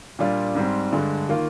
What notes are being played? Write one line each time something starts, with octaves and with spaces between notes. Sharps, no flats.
A#2 G3 D4 F4
G#2 G3 C4
G2 D3 G#3
D#3 A#3 F4